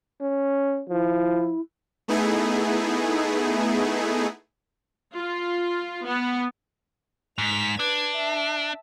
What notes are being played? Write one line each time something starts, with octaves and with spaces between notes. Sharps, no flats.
C#4
F3 E4
A3 B3 D#4 E4 G#4
F4
B3
G#2 B6 F7
D4 B4 G#6
E5 A5